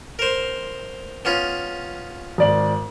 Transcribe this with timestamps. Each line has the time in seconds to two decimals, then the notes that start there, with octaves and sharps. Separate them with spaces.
0.19 A#4 C5
1.25 B3 C#4 F4
2.38 G#1 D5 F#7